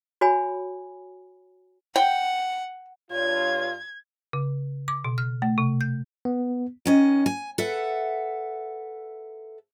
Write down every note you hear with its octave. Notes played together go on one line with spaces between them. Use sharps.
F#4 C#5 G#5 B5
F#5 G5
G2 F4 C#5 G#6
C#3
D6
B2
F6
A3
C3
G6
B3
D#3 C#4 D#5
G#5
A4 B4 E5 F#5